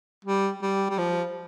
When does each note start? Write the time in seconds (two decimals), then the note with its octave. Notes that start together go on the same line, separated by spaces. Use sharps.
0.25 G3
0.62 G3
0.90 G3
0.98 F3